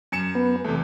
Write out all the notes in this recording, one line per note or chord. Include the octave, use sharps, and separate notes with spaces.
F#2 C#7 E7
B3
E2 C3 A3